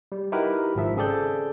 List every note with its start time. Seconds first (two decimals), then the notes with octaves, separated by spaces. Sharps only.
0.12 G3
0.32 D#4 E4 F#4 G4 A#4 B4
0.75 G#1 G#2 F3 E5
0.96 C#3 C4 G#4 A4 D5 G6